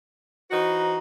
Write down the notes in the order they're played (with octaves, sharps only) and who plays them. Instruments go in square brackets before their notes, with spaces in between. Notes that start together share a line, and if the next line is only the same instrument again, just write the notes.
[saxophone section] E3 D#4 F#4 [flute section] B4 C5 A#5